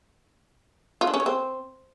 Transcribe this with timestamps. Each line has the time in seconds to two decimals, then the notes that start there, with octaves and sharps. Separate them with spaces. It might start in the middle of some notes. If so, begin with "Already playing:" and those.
1.01 F4
1.07 D4
1.14 C#4
1.20 C#5
1.26 C4